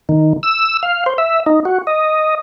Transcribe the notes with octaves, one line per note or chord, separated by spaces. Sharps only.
D#3
E6
F5
C5
E5
D#4
F#4
D#5